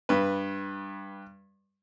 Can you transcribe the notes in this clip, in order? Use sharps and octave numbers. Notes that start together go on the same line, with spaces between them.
G2 B4